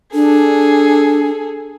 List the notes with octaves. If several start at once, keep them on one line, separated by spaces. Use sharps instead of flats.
D4 G#4 A4